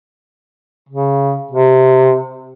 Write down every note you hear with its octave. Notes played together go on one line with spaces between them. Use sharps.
C#3
C3